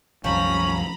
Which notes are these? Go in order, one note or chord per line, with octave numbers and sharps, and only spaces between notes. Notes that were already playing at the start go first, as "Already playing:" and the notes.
C2 F#2 F3 C#4 A#5 B5